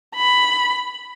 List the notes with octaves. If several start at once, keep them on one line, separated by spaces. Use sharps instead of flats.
B5